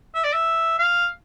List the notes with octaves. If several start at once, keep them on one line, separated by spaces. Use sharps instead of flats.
E5
D5
E5
F5